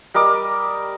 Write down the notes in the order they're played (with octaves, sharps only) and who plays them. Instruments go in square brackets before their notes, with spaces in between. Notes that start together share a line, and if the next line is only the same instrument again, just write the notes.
[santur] G3 A#4 D#5 D6